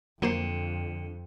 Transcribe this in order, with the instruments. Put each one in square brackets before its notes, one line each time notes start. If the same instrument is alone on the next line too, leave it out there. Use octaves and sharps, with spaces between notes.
[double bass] F2 [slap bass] D3 [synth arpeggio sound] F#3 A#3 C5